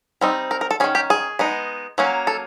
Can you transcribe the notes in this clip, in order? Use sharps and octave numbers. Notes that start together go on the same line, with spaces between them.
G3 C4 D#4
A#4
A#4
A4
D#3 G#3 C#4 G#4
G4
G#4
G#3 B3 D#4
F#3 A#3 C#4
A4